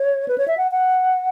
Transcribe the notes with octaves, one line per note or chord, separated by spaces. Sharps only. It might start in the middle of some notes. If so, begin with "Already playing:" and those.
Already playing: C#5
B4
C#5
E5
F#5
F#5